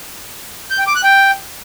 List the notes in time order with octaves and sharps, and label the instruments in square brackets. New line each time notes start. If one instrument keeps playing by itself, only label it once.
[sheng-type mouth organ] G6
G5
D6
F#6
G5